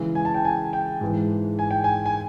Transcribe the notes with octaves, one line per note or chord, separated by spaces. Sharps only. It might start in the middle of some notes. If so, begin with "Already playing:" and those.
Already playing: C#3 E3 G#3
G#5
A5
G5
G#5
G5
G#2 E3 G#3
G#5
G5
G#5
G#5